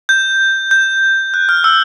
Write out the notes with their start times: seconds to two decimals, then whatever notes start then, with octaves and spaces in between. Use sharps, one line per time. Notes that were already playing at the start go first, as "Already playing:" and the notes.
0.09 G6
0.71 G6
1.34 F#6
1.49 F6
1.64 E6